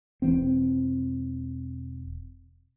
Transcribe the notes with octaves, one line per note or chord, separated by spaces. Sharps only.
E1 E3 C4